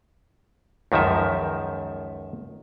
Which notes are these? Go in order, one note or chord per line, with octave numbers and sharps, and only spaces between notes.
C#2 F#2 D#3 F3 E5